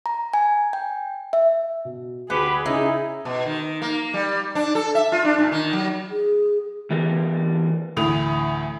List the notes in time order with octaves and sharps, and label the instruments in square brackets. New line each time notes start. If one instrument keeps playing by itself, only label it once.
[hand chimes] A#5
G#5
G5
E5
[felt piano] B2
[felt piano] D2 C#7 [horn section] G3 G4 B4 [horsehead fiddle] G#4 [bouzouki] F#5
[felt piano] C#3 C#4 [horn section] D#4 [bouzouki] E4
[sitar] B2
D#3
A#3
G3
D4
A4
E5
F4
D4
A#2
D#3
F#3
[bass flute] G#4
[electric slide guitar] E3 G3 B3 A#4
[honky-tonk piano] D2 A2 E3 D#6 F7